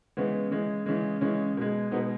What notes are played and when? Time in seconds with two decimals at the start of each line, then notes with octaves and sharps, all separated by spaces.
0.17 C#3 E3 G#3 B3
0.51 C#3 E3 G#3
0.86 C#3 E3 G#3
1.21 C#3 E3 G#3 C#4
1.57 B2 G#3
1.91 B2 G#3 B3 D#4